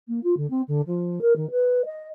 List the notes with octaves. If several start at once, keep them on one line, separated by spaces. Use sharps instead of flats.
A#3
F4
D3
C4
D3
F3
A#4
D#3
B4
D#5